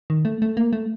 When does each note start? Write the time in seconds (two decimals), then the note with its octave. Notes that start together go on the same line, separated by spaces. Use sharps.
0.10 D#3
0.25 A3
0.42 A3
0.57 A#3
0.73 A3